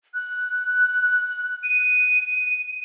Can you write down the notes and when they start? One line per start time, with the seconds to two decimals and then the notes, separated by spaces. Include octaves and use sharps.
0.14 F#6
1.63 D#7